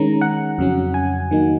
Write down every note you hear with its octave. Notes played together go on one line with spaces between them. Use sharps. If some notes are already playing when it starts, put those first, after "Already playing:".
Already playing: D#3 G#3 C#4 A#5
F#5
F2 C#3 F#3 C#4
G#5
D#3 F#3 A#3 D#4